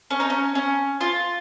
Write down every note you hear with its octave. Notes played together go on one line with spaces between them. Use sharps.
C#4
D#4
C#4
C#4
F4